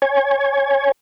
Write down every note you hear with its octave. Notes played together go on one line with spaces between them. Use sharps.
C#5 G#5